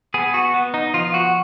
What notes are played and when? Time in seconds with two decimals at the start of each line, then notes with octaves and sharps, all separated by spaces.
0.14 B3 G#4
0.34 F#4
0.54 B3
0.74 D#4
0.94 F3 F4
1.14 F#4